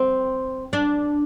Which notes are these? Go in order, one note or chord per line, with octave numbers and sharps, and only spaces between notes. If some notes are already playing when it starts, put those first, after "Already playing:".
Already playing: C4
D4